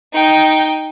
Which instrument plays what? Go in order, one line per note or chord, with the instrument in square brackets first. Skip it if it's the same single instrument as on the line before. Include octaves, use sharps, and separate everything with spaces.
[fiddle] D#4 G5